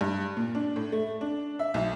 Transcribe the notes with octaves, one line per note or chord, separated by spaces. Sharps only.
G2
A#2
D4
A2
A3
D4
E5
B1